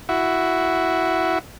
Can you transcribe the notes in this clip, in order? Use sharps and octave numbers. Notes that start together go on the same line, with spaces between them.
E4 F#4